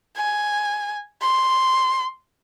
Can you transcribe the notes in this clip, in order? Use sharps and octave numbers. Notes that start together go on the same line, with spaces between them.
G#5
C6